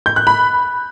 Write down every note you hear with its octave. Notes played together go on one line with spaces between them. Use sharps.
G6
F#6
B5